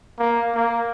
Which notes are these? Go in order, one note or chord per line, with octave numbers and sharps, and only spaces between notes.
A#3
A#3